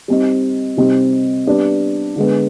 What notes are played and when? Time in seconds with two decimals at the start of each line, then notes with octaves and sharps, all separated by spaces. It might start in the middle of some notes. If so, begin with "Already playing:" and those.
0.08 G3 C4 D#4
0.77 C3 G3 C4 D#4
1.47 G3 B3 D4
2.16 D3 G#3 B3